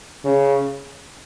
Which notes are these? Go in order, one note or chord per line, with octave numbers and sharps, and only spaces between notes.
C#3